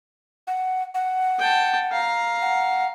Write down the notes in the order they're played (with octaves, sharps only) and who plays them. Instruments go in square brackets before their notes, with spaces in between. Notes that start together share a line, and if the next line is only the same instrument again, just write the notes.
[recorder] F#5
F#5
[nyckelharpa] G5 A5
F5 A#5
[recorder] F#5